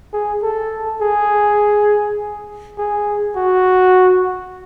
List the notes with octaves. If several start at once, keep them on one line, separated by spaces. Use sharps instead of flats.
G#4
A4
G#4
G#4
F#4